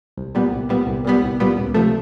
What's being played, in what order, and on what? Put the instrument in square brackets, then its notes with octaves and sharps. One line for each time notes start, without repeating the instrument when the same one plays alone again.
[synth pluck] C2
A#2 G3 B3
C2
A#2 G3 B3
C2
A#2 G3 B3
C2
A#2 G3 B3
C#2
C3 F3 A3